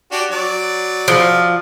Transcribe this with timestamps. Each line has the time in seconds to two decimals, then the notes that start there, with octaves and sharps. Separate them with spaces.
0.12 D4 F#4 G4
0.32 F#3 D5
1.08 F3